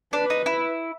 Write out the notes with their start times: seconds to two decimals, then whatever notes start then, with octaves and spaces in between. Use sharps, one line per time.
0.13 D4 B4
0.30 D#4
0.46 E4